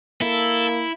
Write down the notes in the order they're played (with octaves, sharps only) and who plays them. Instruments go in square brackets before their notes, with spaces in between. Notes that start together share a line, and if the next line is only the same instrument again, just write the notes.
[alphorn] A#3 [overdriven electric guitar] E4 [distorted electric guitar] A4